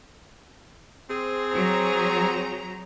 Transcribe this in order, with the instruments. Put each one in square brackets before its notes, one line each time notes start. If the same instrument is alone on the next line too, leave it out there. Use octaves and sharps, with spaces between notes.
[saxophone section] C4 G#4
[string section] F#3 A#5